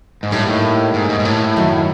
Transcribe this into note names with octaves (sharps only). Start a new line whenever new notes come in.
G#2
A2 G3 A#3 D#4 G4
A2
G#2
G#2
G#2
A2
F#2 D#3 F#3